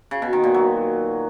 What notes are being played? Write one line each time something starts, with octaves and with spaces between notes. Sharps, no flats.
C#3
B2
D#3
A#2
F#3